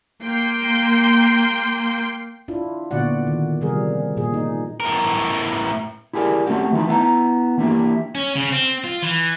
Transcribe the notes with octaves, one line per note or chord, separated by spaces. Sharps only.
A#3 G5 C6
D4 E4 F4
A#2 D3 B3 F#4 D5 F#5
D#3
C3 F3 G3 G#4 A#4
A#2 G#4
D#4
A2 A#4
E4 G4 G#4 A#4 D5
A3 C4 C#4 F#4 G4
E3 A3 D#4 E4
B3 E4 F5 A#5
E3 A#3 D4 E4 G4
C#4
C#3
C4
F4
E3